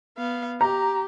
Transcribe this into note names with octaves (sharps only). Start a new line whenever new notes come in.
B3 F5
G4 A#5